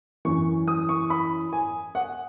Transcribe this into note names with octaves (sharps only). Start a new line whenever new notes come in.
F#2 E3 C#6
D#6
C#6
B5
G#5
F#5